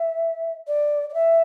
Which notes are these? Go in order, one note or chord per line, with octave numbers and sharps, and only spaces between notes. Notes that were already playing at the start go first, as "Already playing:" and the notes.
Already playing: E5
D5
D5
E5